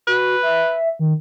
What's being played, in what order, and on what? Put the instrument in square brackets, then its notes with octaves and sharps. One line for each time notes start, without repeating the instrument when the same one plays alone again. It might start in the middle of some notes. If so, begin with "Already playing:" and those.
[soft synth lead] F#4 [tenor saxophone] B4
[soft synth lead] E5
D#3